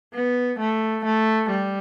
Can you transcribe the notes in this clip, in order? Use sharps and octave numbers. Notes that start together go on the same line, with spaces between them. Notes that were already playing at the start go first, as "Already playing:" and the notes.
B3
A3
A3
G3